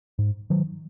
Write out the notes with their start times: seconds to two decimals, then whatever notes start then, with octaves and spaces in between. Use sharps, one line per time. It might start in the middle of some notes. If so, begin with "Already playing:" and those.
0.19 G#2
0.50 D#3 F#3